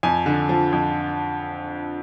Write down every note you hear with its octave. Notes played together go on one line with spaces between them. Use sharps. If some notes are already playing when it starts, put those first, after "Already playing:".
F2 G#5
D3
F3
F2